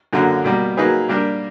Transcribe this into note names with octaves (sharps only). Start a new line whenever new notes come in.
F#2 D3 F#3 A#3
B2 G3 A#3
F#3 A#3 D#4 G#4 B4
G3 A#3 D4 G4 A#4